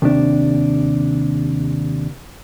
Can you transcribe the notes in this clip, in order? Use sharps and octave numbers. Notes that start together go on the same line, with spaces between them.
D#2 C3 D4